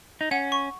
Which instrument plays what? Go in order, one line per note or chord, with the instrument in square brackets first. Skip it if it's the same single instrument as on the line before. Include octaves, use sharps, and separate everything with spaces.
[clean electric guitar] D#4
[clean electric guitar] C#4 [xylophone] F#5
[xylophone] C#6